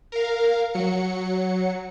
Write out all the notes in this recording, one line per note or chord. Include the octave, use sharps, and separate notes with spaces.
A#4 F5
F#3 C#7